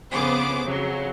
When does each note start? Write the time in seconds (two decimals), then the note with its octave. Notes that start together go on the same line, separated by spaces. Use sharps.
0.12 F2 C#3 B3 G#4 C5 D6
0.63 F2 C#3 F#3